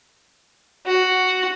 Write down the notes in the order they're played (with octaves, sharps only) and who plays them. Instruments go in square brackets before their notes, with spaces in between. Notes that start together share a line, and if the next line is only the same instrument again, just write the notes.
[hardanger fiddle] F#4